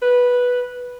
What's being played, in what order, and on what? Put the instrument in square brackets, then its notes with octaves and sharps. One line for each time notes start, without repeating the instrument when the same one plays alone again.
[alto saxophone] B4